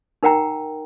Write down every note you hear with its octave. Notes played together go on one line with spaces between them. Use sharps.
D#4 A#4 F#5 G5 A#5